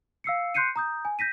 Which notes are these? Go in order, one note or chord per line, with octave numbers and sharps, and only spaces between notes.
F5 E6 C7 C#7
C6 F#6 G6 C7 C#7 D#7
A#5 D#6 G6
G#5
G6 A#6 B6 D#7